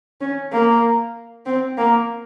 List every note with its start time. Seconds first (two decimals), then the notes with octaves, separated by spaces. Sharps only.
0.21 C#4
0.52 A#3
1.46 C4
1.78 A#3